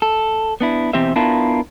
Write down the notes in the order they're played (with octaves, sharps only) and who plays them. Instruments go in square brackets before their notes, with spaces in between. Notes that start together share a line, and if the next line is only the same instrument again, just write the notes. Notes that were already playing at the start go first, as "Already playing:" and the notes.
[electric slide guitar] A4
B3 D4 E4
B2 E3 C4 G4 C5 E5
B3 D4 E4 F4 A#4 A5